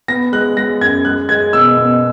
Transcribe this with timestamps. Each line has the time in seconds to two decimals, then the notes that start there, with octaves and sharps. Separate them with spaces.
0.08 B3 A#6
0.33 G#3 F#6
0.57 G#3 A#6
0.81 F#2 G#6
1.05 G#3 F#6
1.29 G#3 G#6
1.53 B2 E6
1.77 B2